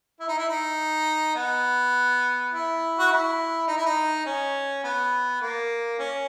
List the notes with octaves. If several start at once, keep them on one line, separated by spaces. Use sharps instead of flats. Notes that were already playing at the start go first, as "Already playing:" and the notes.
E4
D#4
E4
D#4
B3
E4
F#4
E4
D#4
E4
D#4
C#4
B3
A#3
C#4